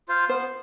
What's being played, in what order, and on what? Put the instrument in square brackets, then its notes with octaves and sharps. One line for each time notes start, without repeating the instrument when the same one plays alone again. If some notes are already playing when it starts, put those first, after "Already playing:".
[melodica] F4 C5 F5
[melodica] B3 [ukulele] C5